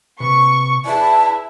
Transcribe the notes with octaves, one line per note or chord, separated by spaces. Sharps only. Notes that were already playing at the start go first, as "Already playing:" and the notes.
C3 B4 C#6
E4 G#4 B4 D5 A5